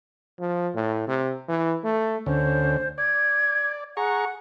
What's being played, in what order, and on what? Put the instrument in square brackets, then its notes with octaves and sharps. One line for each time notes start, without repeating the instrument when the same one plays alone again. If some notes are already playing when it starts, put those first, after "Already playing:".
[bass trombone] F3
A2
C3
E3
A3
[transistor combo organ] D2 D3 C#4 [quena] C5
[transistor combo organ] D5 [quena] G#6
[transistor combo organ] G#4 A#5 C#6 [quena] F#5